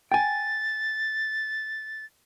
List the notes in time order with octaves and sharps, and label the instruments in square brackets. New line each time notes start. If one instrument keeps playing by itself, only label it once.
[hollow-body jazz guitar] G5 G#5 [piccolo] A6